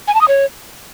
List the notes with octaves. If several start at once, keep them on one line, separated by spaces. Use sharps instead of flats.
G#5
A5
D#6
C#5